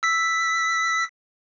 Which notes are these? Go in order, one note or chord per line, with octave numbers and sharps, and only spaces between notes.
E6 B6